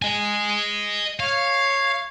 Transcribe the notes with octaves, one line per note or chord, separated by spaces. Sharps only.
D#5 G#5
C#5 F5